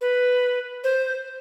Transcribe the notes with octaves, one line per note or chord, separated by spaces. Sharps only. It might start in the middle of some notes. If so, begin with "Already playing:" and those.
B4
C5